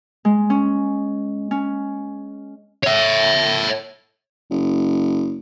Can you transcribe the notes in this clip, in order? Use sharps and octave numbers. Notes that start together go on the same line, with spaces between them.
G#3
C#4
C#4
C#5 E5
F#1